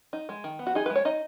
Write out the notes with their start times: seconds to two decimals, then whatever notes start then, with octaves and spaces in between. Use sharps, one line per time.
0.13 D#4
0.29 G#3
0.44 D#3
0.59 B3
0.67 F#4
0.75 D#4 G#4
0.86 G#3 B4
0.95 C#5
1.05 D#4 D#5